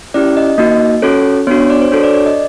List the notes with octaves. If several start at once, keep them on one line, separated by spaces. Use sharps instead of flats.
C#4 E4 G4 D5
D#5
A#3 D#4 F#4 D#5
C#4 F#4 A4 C#5
B3 D4 F#4 C#5
C#5
D5
C5
D4 F#4 A4 C#5
D5
D5
D#5